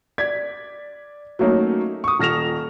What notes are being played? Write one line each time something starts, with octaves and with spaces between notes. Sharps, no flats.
D5 G#6 B6
F#3 A3 A#3 C#4 D#4
C#6 D#6
D#1 F6 A#6 E7 F7